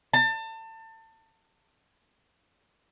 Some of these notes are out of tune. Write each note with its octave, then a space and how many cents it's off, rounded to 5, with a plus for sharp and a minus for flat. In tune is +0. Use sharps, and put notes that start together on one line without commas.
A5 +30